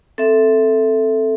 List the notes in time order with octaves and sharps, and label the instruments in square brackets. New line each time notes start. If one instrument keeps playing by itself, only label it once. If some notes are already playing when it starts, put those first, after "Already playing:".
[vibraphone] C4 A4 E5